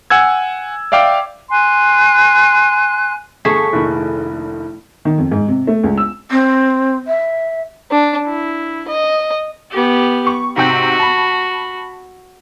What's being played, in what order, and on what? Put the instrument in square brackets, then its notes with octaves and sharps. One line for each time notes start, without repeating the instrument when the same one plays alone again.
[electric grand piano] F#5 G#5 E6 G#6
D5 E5 F5 G5 D6
[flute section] G#5 C6 F#6
[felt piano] G1 A5 [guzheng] A3 [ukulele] G#4 [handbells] C#6 B6
[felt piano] F1 A#1 D#3 [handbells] E4
[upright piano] D#3
F2
G#2
C3
A3
C#2
E6
[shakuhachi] C4
E5
[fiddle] D4
E4
D#5
[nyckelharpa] B3 G4
[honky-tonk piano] C#6
[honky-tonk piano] G#2 C3 G5 [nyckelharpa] F#4
[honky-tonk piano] A5 B5